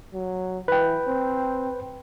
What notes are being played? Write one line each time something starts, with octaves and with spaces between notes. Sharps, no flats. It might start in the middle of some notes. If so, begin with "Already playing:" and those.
F#3
E3 B4 G5
C4